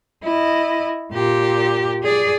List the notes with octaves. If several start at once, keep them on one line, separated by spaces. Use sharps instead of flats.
E4 D#5
A#2 G4
G#4 D5